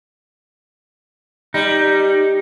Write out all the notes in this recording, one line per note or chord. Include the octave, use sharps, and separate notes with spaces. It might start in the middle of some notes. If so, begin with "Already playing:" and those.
G3 D#4